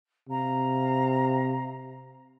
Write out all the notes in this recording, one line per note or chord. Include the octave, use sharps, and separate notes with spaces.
C3 F5 A#5